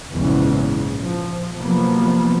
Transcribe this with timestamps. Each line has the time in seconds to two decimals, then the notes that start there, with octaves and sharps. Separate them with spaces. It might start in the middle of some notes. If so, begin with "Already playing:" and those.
0.11 A#1 E2 G#2 C#3 E3
0.99 F3
1.56 C3 F3 F#3 A#3 B3